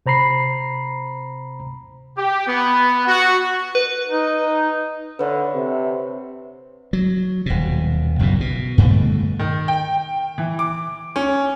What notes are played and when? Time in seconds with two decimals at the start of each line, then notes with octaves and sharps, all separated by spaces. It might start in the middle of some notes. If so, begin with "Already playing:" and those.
0.06 C3 C5 A#5 B5 C7
2.17 G4
2.47 B3
3.07 F#4
3.75 B4
4.08 D#4
5.19 D3 B4 C#5 E5
5.55 C3
6.93 F#3
7.46 D#1 B2
8.19 F#1 B1 F#2 A#2
8.41 B2
8.78 G2 B2 D3 A3
9.39 D#3
9.68 G5
10.38 E3
10.59 D6
11.16 C#4